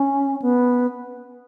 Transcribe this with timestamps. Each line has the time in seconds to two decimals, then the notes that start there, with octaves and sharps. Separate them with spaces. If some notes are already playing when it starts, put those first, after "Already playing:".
Already playing: C#4
0.42 B3